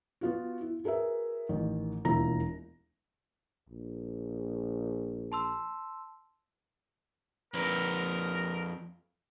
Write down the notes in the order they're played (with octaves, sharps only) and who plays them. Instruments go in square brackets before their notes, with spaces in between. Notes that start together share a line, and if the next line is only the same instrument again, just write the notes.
[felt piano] B3 F4 F#4
E4
F#4 G#4 A#4 B4 E5
A1 D#3
E1 D#2 E4 F4 A#5 A#6
[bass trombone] A#1
[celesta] A5 C6 E6
[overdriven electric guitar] F2 B4 [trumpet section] A#4